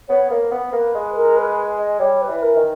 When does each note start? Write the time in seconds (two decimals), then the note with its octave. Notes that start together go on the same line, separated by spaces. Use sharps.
0.08 B3 C#5
0.30 A#3
0.51 B3
0.72 A#3 B4
0.94 G#3
1.15 A#4
1.36 B4
1.78 D#5
1.99 G3 C#5
2.22 B4
2.28 E3
2.42 A#4
2.56 D#3